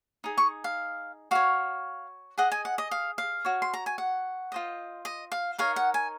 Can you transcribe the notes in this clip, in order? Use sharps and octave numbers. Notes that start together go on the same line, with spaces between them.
D#4 G#4
C#6
F5
F#4 C#5 F5
G#4 D#5 F#5
G#5
F#5
D#5
F5
F5
F#4 C#5
C6
A#5
G#5
F#5
F4 C5 D#5
D#5
F5
D#4 A#4 C#5 F5
F#5
G#5